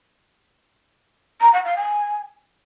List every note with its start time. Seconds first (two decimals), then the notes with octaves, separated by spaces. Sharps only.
1.41 A#5
1.53 F#5
1.65 F5
1.77 G#5